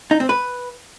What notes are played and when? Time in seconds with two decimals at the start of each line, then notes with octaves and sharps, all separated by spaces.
0.11 D#4
0.20 C4
0.29 B4